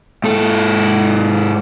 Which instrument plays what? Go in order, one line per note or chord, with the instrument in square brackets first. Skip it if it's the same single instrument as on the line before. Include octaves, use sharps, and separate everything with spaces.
[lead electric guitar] G#2 A4